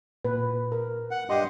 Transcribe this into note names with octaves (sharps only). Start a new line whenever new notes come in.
A#2 B4
A#4
F#5
G2 G4 D#5 C6